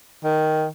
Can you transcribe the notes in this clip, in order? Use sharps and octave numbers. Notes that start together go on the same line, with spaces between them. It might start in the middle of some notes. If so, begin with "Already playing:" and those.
D#3